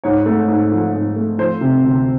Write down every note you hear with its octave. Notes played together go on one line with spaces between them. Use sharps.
G#2 C#5
A3
G#2
F3
G#2
A3
F3 C5
C3
D2